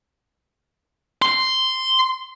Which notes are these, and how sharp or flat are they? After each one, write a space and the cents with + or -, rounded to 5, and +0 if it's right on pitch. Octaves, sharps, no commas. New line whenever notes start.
C6 -5